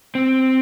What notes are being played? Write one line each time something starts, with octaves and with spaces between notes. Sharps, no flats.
C4